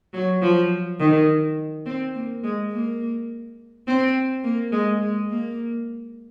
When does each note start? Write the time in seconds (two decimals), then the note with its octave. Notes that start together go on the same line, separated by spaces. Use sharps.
0.14 F#3
0.42 F3
0.99 D#3
1.86 C4
2.15 A#3
2.44 G#3
2.72 A#3
3.87 C4
4.44 A#3
4.72 G#3
5.01 G#3
5.30 A#3